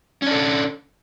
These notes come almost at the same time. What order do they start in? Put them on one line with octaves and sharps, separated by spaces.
C#4 D4 A4